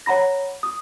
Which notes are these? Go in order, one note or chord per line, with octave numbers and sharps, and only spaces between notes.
C#5 F#5 A#5 B5 A#6
D#6